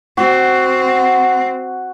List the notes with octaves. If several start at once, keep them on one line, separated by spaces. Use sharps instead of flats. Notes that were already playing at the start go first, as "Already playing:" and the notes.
C4 F#4